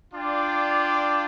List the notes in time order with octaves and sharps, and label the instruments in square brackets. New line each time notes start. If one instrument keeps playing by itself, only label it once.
[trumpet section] D4 F4 D5 G5